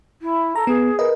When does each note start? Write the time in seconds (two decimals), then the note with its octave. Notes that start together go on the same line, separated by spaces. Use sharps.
0.21 E4
0.56 A4 A#5
0.67 B3 G#4
0.99 A#4 B4 D#5